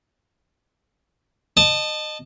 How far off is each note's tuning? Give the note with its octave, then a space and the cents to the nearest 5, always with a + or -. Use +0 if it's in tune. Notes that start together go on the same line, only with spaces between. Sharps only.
D#5 -25 A5 +0